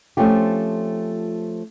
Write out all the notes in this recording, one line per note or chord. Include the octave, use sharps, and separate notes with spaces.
F3 A3 C4 C#4 F4 G4